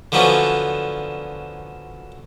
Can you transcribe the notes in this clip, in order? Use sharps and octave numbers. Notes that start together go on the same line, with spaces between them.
D3 F3 F#3 B3 C#4 D4